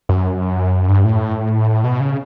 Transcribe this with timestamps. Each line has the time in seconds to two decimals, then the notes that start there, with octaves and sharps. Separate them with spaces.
0.09 F#2
0.88 G2
1.04 A2
1.84 B2
2.00 C#3